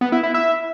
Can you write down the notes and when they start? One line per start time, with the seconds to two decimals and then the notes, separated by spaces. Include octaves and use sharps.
0.01 B3
0.12 E4
0.23 E4
0.34 E5